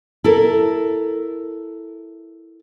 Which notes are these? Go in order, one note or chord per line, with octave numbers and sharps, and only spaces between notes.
E4 A4 A#4